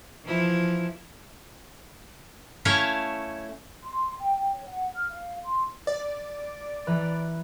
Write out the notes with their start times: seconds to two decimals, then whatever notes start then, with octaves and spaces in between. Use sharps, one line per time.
0.24 E3 F3 E4
2.65 A3 C#4 E4 C#5 E5 F5
3.83 C6
4.18 G5
4.52 C#5
4.66 F#5
4.95 F6
5.11 F5
5.43 C6
5.87 D5
6.87 E3 B4 A#5